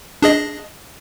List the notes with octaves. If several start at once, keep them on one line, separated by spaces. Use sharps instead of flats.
D4 G#4 D#5